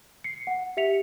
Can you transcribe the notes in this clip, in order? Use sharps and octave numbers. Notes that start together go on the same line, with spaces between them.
C7 C#7
F#5
G4 E5 B6 C#7 F7